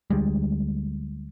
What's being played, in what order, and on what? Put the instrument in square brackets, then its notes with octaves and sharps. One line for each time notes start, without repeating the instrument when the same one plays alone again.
[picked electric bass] D2 G3 G#3